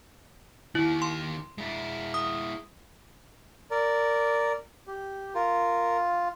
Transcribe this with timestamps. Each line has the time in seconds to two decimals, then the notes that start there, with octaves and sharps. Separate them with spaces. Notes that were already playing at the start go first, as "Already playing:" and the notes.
0.75 D#3 E4 G4
1.02 C6
1.58 G#3 E4
2.14 D#6
3.71 A#4 D5
4.88 G4
5.35 F4 A#4